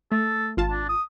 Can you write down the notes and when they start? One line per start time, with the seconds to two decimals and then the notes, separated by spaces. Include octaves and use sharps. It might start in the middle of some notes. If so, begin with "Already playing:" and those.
0.12 A3 A4
0.57 G#1 F4 A5
0.70 D4
0.89 D#6